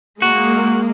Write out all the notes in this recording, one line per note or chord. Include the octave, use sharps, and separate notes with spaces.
G#3 A#3 F#4